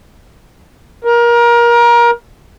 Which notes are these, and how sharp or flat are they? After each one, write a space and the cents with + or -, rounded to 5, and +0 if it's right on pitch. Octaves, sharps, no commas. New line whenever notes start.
A#4 +25